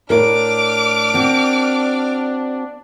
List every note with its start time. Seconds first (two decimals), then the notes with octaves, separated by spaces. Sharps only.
0.10 A2 D4 A#4 D6 F6
1.14 C4 F#4